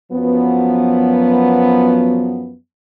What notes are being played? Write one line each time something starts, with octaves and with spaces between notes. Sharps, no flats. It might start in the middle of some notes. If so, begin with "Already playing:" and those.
F#2 F3 F#3 B3